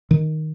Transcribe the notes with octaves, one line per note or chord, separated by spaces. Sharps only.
D#3